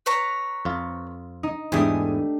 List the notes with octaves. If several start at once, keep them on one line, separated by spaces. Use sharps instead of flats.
B4 C#5 A#5
F2 F4
D#4
E2 G#2 E3 A3 D4 G4 G#5 D#6